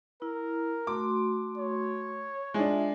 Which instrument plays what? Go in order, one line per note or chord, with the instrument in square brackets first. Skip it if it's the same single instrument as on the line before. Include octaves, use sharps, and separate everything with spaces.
[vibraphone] E4 [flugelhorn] A#4
[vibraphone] A3 F#4 C6 [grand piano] D6
[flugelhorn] C#5
[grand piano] G#3 D4 [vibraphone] F4 E5